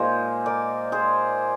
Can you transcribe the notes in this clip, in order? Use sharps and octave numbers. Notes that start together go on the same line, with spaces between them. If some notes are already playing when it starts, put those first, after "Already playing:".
Already playing: A#2 G#3 G#4 C5
A#4 D5
G#4 C5